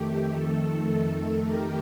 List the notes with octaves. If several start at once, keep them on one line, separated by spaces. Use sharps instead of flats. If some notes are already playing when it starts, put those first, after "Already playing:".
Already playing: F2 D#3 A3 G4
A4
G4 A#4